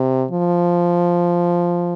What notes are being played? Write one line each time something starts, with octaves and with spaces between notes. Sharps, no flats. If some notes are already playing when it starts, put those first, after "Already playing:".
Already playing: C3
F3